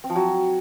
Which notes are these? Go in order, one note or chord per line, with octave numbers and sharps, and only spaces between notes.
C4
F3
F#3